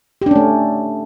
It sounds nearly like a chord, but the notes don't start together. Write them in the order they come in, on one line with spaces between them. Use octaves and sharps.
G4 D4 C#4 A3